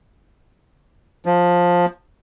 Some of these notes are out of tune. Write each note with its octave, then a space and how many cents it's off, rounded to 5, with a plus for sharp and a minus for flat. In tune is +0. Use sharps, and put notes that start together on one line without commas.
F3 +10